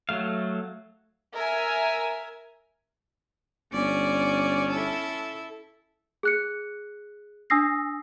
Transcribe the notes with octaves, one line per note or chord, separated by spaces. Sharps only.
F#3 A3 F5
A#4 E5 G#5
G1 C#4 D5
E4 A4
G#4 F#6 C#7
D4 G#5 D#6 E6 A#6 C7